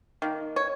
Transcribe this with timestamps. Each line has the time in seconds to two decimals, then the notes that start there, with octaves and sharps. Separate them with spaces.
0.22 D#3 A#3
0.56 C#5